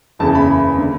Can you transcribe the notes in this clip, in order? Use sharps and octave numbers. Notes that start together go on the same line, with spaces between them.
F#1 E2 C#3 E3 A5
B5
D3